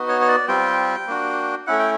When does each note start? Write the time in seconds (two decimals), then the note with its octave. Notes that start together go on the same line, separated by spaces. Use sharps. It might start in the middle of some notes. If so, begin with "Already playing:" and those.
Already playing: B3 D#4 F#4
0.08 C#5
0.21 C#5
0.28 D5
0.48 G3 C4 F4 G5
1.07 A#3 D4 F#4
1.67 A3 C#4 E4 F#5
1.79 G5